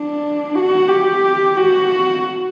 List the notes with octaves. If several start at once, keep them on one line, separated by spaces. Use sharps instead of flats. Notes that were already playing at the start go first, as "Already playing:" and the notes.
Already playing: D4
F#4
G4
F#4